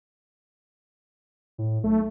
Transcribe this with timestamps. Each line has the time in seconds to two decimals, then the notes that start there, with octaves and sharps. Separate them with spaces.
1.58 A2
1.84 B1 A3